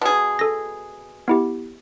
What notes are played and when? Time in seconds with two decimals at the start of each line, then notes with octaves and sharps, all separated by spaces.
0.01 B2 G#4
0.39 A4 A#6
1.28 B3 E4 G4